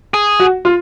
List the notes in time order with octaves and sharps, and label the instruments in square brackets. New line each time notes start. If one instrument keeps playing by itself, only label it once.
[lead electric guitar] G#4
[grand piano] F#4
F4